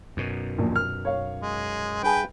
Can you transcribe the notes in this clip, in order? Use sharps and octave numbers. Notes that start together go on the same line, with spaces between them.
F#2 B2
A#1 D#2 A#2
F6
C#5 F5
G#3
G2 G#4 B4 G5